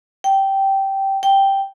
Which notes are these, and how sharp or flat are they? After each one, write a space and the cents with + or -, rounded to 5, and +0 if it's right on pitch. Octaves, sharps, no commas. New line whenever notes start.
G5 -10
G5 +0